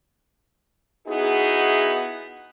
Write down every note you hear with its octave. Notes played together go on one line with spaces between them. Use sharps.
B3 D#4 E4 F#4 G#4